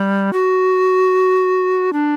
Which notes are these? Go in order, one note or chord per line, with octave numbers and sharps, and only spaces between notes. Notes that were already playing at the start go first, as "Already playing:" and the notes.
Already playing: G3
F#4
D4